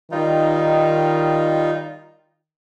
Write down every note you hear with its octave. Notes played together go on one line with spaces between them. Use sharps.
D#3 G3 D#4 F4